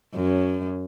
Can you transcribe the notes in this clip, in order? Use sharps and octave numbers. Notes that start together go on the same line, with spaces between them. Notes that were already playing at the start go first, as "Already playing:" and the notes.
F#2